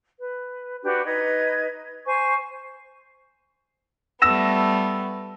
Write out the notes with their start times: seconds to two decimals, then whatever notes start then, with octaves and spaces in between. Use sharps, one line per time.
0.20 B4
0.83 D4 F#4 G4 B4
1.06 D#4 B4 D#5 G#6
2.05 C5 G#5 C#6
4.22 G3 A3 B3 E6 A#6 E7